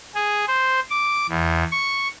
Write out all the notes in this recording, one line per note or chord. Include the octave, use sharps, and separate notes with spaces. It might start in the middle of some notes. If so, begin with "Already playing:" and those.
G#4
C5
D6
E2
C#6